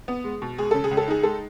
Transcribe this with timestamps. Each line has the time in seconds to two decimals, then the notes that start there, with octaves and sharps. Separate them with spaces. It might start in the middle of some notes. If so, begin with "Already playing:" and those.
0.08 B3
0.24 G#3
0.42 B2
0.58 G#3 G#4
0.71 C#3 A4
0.84 G#4
0.91 C#2
0.97 A4
1.08 D#4 G#4
1.23 G#3 A4